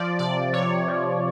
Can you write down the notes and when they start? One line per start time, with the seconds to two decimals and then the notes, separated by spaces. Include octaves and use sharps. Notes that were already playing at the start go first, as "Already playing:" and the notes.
Already playing: F3 D5
0.19 C3 D5
0.53 C3 C#5
0.88 F3